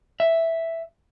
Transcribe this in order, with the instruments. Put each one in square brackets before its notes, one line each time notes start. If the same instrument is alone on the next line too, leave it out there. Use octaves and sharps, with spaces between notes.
[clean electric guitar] E5